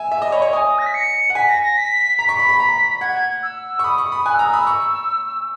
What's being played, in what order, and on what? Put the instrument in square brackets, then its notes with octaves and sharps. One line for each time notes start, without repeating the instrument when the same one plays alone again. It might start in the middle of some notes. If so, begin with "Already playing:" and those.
Already playing: [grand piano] E5 G#5
E5
D#5
[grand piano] C#5 [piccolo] B5
[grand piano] C#5 [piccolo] C#6
[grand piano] G#5 [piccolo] D#6
[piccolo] A#6
B6
C#7
[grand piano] F#5
[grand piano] G#5 [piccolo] B6
[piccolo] A#6
A#6
B6
[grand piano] A#5 [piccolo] B6
[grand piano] C#6
B5
B5
A#5
[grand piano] F#5 [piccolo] G#6
[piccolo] G#6
E6
[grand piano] C#6
[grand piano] B5 [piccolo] D#6
[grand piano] C#6
B5
[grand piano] G#5 [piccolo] F#6
[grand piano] A#5 [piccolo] E6
[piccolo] D#6
[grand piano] B5 [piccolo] E6
[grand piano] C#6